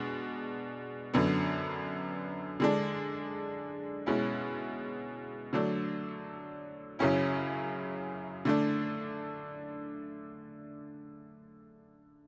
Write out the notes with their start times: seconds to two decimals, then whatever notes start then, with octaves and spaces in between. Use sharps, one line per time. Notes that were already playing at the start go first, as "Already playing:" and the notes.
Already playing: B2 G#3 D4
1.14 F#2 D3 F#3 B3
2.60 D3 G#3 D4
4.06 B2 G#3 C#4 E4
5.53 D3 F#3 A3 D4
6.99 F#2 C#3 F#3 C#4 E4
8.45 D3 A3 D4